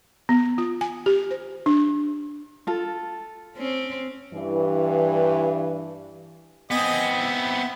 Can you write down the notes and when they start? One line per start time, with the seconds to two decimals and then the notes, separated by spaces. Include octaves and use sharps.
0.29 B3
0.58 F4
0.81 G#5
1.06 G4
1.31 C5
1.66 D4
2.67 F4 A4
3.57 C4 C#4
4.33 G2 E3
6.71 B3 C4 D#5 G#5 D#6
7.20 E4